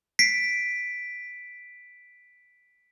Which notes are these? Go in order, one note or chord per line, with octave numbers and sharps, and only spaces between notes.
B6 C7 D7